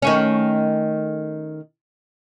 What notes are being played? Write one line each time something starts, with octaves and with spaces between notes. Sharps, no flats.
D#3 A3 C#4